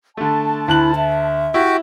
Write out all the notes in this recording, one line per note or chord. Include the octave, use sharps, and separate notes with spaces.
D3 A3 A5
D2 E4 F#6 F#7
E5
E4 F#4 G4 D6